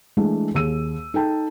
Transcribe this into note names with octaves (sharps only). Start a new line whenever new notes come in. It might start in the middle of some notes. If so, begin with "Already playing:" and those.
E3 G#3 A3 D4
D#2 G#4 E6 D#7
D#4 A4 G5 A5